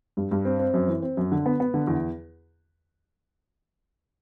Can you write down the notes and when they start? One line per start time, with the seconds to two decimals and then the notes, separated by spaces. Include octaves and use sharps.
0.17 G2
0.31 G2
0.45 C4
0.59 C4
0.74 F#2
0.88 E3
1.02 C4
1.17 F#2
1.32 D3
1.46 B3
1.60 B3
1.74 D3
1.87 E2